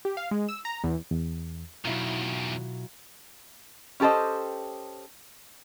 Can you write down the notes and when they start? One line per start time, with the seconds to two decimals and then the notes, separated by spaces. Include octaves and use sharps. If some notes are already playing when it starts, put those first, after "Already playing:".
0.05 G4
0.17 F5
0.31 G#3
0.49 E6
0.65 A#5
0.84 E2
1.11 E2
1.85 E2 B2 D#3 F#3 E4 F4
4.00 C#4 G4 A4 C5 D#5